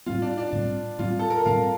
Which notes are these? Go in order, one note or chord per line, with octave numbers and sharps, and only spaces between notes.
A2 G3 C4 F4
D4
D4
A2 G3 C4
A2 G3 C4 F4
A4
A#4
A2 G3 C4 F5